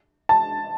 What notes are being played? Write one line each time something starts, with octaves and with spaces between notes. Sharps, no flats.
A5